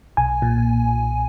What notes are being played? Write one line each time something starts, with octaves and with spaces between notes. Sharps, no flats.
B1 G#5
A#2